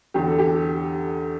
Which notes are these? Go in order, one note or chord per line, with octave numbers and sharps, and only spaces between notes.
E2 D3 G4
A4
G4